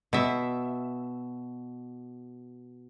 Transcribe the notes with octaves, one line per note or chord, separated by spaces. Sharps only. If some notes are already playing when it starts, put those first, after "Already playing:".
B2 E5